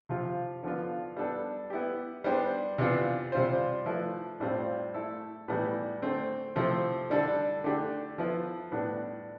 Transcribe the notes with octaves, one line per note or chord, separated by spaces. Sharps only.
C3 F3 C4 F4
D3 F3 B3 F4
G3 B3 D4 A4
B3 E4 G4
G3 B3 D4 G4 C5
C3 E3 B3 D4 F4
C3 G3 C4 F4 C5
F3 A3 E4 B4
A2 G3 C4 F4 C5
A3 E4 A4
A2 E3 G3 B3
D3 A3 C4
C3 F3 A3 C4 E4
D3 G3 D4 A4
D3 A3 D4 G4
F3 B3 E4 B4
A2 G3 B3 D4